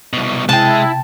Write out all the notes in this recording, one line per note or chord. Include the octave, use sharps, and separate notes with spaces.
C2 B2
C3 G#3 E4 G5 A5